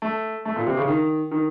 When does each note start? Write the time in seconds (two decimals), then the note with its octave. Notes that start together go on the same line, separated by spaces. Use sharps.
0.02 A3
0.45 A3
0.56 A#2
0.66 C3
0.77 C#3
0.88 D#3
1.31 D#3